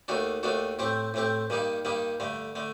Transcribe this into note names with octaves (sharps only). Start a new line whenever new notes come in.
D#2 D#3 A3 D4 F#4
D#2 D#3 A3 D4 F#4
A2 A3 C4 G4
A2 A3 C4 G4
G2 D#3 G3 A#3 D#4
G2 D#3 G3 A#3 D#4
G2 D3 A3
D3 A3